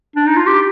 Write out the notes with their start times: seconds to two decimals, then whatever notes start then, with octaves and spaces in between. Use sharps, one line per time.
0.16 D4
0.27 D#4
0.36 F4
0.46 G4